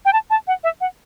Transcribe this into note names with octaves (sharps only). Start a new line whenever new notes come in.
G5
A5
A5
F#5
E5
F#5